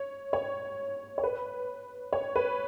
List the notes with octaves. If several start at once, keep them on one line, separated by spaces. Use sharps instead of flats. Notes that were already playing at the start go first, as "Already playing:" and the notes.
Already playing: C#5
C#5
C#5
B4
C#5
B4